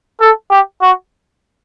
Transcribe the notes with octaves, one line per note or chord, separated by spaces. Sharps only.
A4
G4
F#4